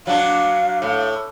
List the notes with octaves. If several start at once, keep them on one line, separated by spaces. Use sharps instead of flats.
F#3 D4 F5
A2